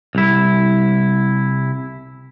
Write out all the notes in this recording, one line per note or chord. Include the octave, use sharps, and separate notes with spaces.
C2 E4